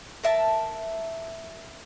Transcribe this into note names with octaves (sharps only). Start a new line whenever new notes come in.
A#4 E5 A5